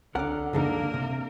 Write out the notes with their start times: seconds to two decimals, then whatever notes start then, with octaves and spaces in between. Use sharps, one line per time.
0.15 C#2 D3 C#4 A#4 F#5 D6
0.53 C#2 F#2 C#3 E3 A#3 D4 D#4 A#4
0.94 C3